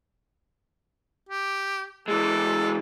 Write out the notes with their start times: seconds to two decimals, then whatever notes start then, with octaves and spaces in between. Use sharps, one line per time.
1.29 G4
2.08 E3 G#3 A4